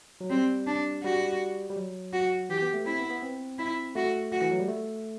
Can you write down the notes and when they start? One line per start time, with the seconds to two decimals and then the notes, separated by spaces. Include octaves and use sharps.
0.21 F#3
0.30 G3 C4
0.67 D4
1.04 G3 F#4
1.70 G3
1.77 F#3
2.13 F#4
2.50 E3 G4
2.62 B3
2.74 A3
2.86 C4 E4
2.99 B3
3.10 B3
3.23 C4
3.58 E4
3.95 A3 F#4
4.32 F#4
4.42 E3
4.51 F#3
4.60 G3
4.68 A3